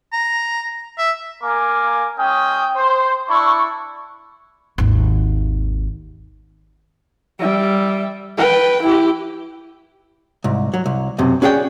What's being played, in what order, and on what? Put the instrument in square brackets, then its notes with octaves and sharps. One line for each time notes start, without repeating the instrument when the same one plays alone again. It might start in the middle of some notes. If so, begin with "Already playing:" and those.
[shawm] A#5
E5
[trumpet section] A#3 A#4 G#5 D6
G#3 C#4 G5 D#6
C5
D4 E4 C#6
[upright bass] G#1 D#2
[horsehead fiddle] G3 E5
B4 G5
E4 G4
[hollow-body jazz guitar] C2 G#2
F#3
C2
B1 F#2 C3
C#4 F#4 G#4 D5 G5